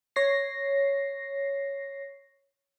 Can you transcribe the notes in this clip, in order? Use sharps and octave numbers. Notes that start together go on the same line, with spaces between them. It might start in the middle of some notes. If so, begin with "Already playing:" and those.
C#5 A#6 C7